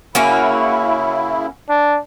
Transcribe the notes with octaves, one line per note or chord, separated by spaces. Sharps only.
C#3 A#3 C#4 E4 F#4
D4